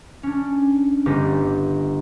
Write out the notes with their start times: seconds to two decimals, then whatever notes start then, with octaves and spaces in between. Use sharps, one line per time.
0.23 C#4 D4
1.06 G1 G4 D#5 D6 A6